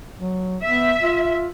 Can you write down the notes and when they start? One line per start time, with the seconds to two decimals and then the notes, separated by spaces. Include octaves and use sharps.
0.19 F#3
0.64 B3 E5
1.01 F4